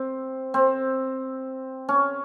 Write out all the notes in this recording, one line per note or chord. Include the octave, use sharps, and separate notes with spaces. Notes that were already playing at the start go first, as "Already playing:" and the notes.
Already playing: C4
C4
C#4